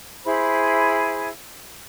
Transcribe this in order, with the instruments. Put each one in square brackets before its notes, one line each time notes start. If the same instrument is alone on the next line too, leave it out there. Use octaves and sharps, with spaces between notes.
[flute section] E4 G#4 C5 B5